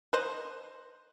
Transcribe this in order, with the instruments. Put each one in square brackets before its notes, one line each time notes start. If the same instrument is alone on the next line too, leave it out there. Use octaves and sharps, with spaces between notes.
[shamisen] B4 C5 D#5